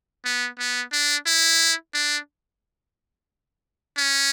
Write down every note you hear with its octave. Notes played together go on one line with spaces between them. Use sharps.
B3
B3
D4
E4
D4
C#4